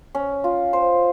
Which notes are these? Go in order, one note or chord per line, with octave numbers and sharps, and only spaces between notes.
C#4
F4
C5